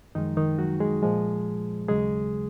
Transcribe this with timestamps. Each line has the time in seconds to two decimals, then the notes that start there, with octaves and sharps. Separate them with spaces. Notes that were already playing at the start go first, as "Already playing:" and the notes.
0.15 F#2 D#3 F3 G#3 D#4
0.37 D#3 D#4
0.59 F#3 F#4
0.80 G#3 G#4
1.03 A#2 F3 G#3
1.88 D#2 C#3 F#3 G#3 G#4